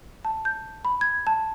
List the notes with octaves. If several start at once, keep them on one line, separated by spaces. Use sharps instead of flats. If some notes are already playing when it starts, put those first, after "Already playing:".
A5
G6
B5
G#6
A5